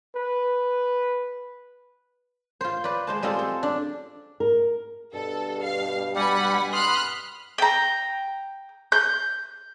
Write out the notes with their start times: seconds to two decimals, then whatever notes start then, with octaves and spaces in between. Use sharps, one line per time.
0.15 B4
2.61 F4 C5
2.84 B4 C5 D5
3.07 G#3 C5 A5
3.23 G3 G#3 C4 F4 A4 C5
3.39 A4
3.63 D4
4.40 A#4
5.13 G2 B2 A4
5.62 F5
6.15 G3 F#5 G#5 B5
6.73 B5 C6 D#6 F6 F#6
7.58 G5 A#5
8.92 G6